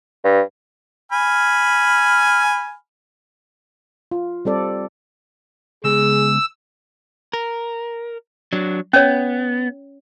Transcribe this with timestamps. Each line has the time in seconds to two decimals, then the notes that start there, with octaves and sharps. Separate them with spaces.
0.24 G2
1.12 G#5 B5 F6
4.11 F4
4.45 G3 C4 A4 D5
5.84 C#3 G#3 B3 G#4 E6
7.33 A#4
8.53 F#3 D4
8.93 B3 C#4 C#5